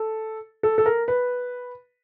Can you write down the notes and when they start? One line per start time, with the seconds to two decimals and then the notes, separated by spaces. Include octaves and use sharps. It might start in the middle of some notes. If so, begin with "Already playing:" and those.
Already playing: A4
0.63 A4
0.78 A4
0.86 A#4
1.08 B4